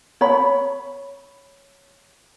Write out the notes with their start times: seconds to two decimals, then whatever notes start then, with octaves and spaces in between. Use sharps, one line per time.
0.21 C#5 B5